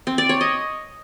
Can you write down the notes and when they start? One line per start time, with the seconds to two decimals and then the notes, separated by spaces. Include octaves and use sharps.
0.07 C4
0.18 D5
0.29 C#5
0.41 D#5